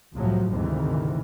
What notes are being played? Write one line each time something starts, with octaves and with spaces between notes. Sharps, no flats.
C2 F#2 A2 F3 F#3
G#1 D2 G#2 C3 D#3 E3